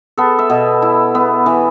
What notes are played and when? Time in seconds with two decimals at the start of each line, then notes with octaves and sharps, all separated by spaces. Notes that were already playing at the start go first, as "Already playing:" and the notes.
0.18 B3 A4
0.39 E5
0.50 B2
0.82 E4
1.15 B3
1.46 E3